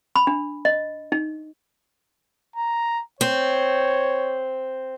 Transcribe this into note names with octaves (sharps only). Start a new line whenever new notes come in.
B5
D4
D#5
D#4
A#5
C4 C#5